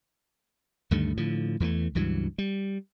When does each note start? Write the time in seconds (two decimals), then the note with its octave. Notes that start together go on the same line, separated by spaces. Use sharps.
0.91 D2 G2 D#3 A3
1.17 A2 D3 F3
1.60 E2 E3 F3 A3
1.95 C#2 G2 E3 F#3
2.38 G3